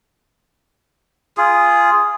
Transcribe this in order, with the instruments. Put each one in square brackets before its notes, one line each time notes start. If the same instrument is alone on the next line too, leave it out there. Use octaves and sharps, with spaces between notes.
[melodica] F4 G#4